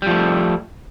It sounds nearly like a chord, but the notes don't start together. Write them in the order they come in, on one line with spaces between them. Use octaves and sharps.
G3 F3 A3